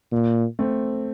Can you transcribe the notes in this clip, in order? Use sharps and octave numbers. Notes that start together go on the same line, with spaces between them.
A#2
A3 C4